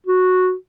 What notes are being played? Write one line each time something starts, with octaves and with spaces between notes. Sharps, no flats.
F#4